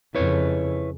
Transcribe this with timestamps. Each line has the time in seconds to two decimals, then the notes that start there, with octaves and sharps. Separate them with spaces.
0.15 F2 C#3 E4 B4 C#5